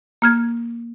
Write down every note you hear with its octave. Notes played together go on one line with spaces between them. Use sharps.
A#3 F6 G#6